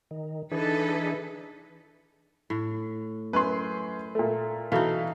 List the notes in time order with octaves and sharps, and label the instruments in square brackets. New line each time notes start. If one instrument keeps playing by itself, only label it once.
[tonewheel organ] D#3
[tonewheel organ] E3 D4 G#4 [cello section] D#4 A4 B4
[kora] A2
[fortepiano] F#2 C6 [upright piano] B4
[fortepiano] A#2 A3
[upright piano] B2 [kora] E3 D#4 [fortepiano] A4 F5